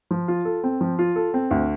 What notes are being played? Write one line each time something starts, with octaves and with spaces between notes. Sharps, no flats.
F3
F4
A4
C4
F3
F4
A4
C4
D2